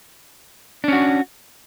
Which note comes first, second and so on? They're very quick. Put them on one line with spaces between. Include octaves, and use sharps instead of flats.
D4 C#4 F#4